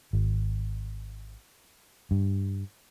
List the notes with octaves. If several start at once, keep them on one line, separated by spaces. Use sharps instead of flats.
G#1
G2